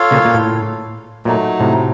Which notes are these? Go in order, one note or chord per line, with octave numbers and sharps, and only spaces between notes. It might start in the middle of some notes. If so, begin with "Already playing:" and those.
Already playing: F4 A4 C#5 F5
A#2 C#3
A#2
A2
A#2 F#3 A3 D#4
A2 C3